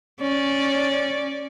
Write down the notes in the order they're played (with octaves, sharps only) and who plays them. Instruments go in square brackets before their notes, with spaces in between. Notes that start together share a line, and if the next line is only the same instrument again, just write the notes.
[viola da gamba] C#4 D5